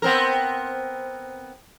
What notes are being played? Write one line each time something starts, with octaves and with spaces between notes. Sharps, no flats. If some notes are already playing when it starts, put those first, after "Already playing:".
B3 C4 A#4